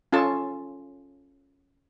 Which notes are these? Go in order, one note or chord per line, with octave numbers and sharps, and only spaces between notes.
C#4 F4 A4 A5